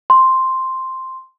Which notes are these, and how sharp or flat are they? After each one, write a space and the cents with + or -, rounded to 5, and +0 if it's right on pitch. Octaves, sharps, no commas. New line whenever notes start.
C6 +0